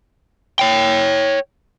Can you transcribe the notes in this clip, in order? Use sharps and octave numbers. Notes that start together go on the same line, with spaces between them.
C#5 G5